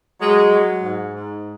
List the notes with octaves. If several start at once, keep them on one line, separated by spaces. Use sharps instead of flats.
F#3 G#3
F#3
G#2
G#2